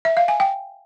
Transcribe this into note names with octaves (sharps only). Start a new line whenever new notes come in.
E5
F5
G#5
G5